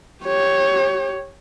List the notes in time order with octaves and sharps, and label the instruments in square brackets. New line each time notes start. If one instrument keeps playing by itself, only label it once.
[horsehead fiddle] G4 C#5